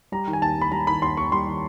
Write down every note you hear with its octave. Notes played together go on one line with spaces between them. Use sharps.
G3 A#5
D#3
G#5
D#2 A5
D#2 B5
G3 A#5
D#3 B5
D#2 C6
D#2 C#6
G3 C6
D#3